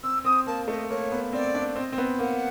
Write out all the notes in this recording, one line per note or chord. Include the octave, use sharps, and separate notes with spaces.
C4 E6
C4 D#6
A#3 A5
A3 D#5
A#3 C#5
B3
C4 D5
D4
C4 D#5
C4
B3
A#3 F#5